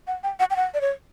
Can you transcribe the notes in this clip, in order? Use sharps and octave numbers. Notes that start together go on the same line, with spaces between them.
F#5
G5
F#5
G5
F#5
D5
C#5